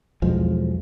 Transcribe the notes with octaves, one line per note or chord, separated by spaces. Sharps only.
B1 E2 F3 G#3